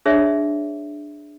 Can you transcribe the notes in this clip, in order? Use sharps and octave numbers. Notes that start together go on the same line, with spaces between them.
D4 G#4 C#5 D5 E5